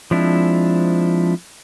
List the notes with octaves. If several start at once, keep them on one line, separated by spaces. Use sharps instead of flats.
F3 G#3 C4 D4 E4